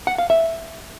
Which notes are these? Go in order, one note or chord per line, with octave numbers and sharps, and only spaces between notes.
F#5
F5
E5